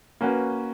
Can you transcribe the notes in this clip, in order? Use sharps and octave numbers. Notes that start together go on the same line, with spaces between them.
A#3 C#4 F#4 B4